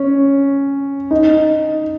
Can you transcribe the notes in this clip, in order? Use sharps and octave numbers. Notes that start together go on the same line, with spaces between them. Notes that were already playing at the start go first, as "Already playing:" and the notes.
Already playing: C#4
D#4